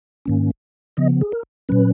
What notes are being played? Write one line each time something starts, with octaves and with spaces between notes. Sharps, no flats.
G#2 D#3 A#3 C#4
C#3 F3 B3 D#5
G#4
A#4
A#2 F#3 C#4 B4